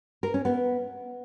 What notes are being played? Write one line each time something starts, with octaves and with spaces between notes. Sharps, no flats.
A#4
C#4
B3